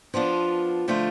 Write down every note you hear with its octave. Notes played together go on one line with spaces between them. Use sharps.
F3 B3 D4 F4
D3 F3 A3 F4